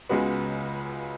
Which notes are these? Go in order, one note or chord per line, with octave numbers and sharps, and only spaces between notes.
C#2 C#3 G#3 B3 F#4